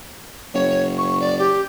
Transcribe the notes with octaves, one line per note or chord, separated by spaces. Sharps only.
F#1 C#5
C#6
D5
G4